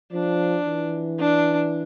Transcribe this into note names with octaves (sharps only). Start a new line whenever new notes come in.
F3 D4
E3
D4